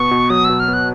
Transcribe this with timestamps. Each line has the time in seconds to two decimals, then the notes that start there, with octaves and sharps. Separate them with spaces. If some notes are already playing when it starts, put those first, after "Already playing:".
Already playing: B2 B3 C#6
0.11 B2
0.30 F#3 D#6
0.45 B2 E6
0.60 F6
0.68 B3
0.74 F#6